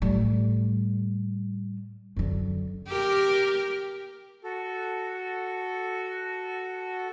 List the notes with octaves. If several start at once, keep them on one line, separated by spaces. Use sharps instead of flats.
A2 G3
F#2 D3
G4 A#4
F#4 A4